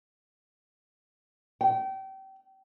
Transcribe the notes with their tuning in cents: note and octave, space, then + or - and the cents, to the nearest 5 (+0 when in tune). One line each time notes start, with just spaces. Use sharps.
G5 -30